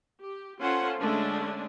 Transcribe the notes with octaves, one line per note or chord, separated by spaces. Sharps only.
G4
C#4 F4 A4 C5 F#5
D3 G#3 A3 C#4 D4